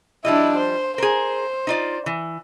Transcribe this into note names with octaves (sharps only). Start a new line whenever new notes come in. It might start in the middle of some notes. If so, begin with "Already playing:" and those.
F3 G3 D4 E4 D#5
C5
G#4 A#4 C5
D#4 F4 D5
E3